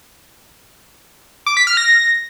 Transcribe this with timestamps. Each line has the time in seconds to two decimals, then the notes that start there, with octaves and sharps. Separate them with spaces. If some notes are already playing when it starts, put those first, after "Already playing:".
1.46 D6
1.57 B6
1.67 F6
1.77 A#6